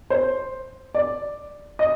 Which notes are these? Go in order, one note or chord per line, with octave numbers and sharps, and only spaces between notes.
C5
D5
D#5